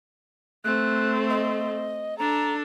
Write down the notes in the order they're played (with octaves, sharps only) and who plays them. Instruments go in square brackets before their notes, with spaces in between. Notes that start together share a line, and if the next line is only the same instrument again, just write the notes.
[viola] A3 C4 [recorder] F#6
[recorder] D#5
[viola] D4 A4 [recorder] A#5